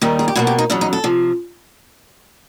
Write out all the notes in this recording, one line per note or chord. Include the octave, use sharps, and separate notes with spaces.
D#2 D#3 G3 G4
G#4
G4
B2 F#3 A#3 F#4
G4
D#4
E2 C#3 F#3 D4
D#4
A4
C3 F3